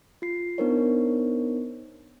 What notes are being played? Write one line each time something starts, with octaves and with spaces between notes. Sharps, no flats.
F4 C7
B3 D4 D#4 A#4 C5 C#5